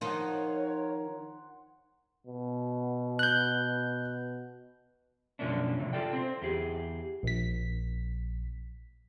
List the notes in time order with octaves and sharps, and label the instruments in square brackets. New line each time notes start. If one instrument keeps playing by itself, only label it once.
[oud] D#3 F3 D#4 [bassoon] A#4 [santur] C5 F#5 [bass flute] C#5
[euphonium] B2
[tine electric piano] F#6 G6
[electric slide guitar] F#2 B2 F3 A#3 C#4 D4
A2 C3 F3
F4 A4 D5 G5
C4 C5
E2 G4 G#4
[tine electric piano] A#1 B6